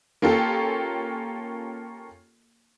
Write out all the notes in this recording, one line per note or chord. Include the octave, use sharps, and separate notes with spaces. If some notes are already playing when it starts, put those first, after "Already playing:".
A#3 C#4 F4 G4 A4